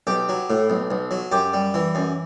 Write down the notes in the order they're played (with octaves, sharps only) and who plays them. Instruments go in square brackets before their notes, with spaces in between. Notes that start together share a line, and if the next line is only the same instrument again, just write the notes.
[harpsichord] B1 G4
F#3
A2
B1
B1
F#3
F#2 G4
G3
E3
F#2